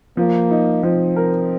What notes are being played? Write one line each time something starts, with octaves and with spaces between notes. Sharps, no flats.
F3 A#3
D#4
F3 C4
A#4